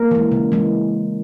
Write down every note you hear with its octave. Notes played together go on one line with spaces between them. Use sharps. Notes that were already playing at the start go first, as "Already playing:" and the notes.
Already playing: A#3 A#4
E3 G#3
C#3
E3 G#3